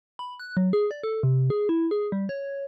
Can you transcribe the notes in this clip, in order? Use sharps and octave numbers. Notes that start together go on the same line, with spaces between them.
B5
F#6
F#3
G#4
D5
A4
C3
G#4
E4
G#4
G3
C#5